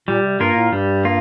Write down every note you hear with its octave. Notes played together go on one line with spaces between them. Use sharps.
A#2 G3
C3
G2 A#3 F4 A#4
A2
G2 G3
A#3 F4